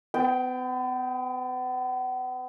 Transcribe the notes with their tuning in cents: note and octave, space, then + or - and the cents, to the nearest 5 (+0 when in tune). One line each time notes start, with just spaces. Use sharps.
B3 +40 G5 +0